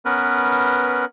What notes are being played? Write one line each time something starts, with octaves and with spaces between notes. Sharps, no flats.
B3 C#4 A#4 B4